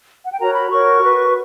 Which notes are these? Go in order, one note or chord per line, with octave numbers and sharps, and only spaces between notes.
F#5
G5
F#4 A#4 C#5 A#5
B5
F#4 A#4 C#5 C#6
F#4 B4